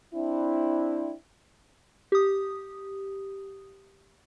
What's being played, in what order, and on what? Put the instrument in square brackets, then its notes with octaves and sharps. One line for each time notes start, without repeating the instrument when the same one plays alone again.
[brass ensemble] C4 D4 E4
[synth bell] G4 D#6